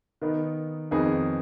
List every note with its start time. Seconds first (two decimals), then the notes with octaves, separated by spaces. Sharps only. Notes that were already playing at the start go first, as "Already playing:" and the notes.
0.22 D#3 B3 D#4
0.91 F2 D#3 B3 D#4 G#4